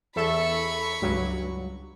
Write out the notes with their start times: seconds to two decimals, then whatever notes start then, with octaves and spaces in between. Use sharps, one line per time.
0.16 E2 A4 E5 B5 C#6
1.02 C#2 G2 F#3